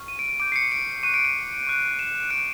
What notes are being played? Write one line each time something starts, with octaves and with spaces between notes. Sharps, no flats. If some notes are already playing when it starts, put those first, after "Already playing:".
Already playing: C#6 F6
D#7
D7
D7
D6 G6 D7
C7
C#7
D7
C#6 F#6 D#7
D7
D#7
C#6 F#6
E7
C#6 F#6 D7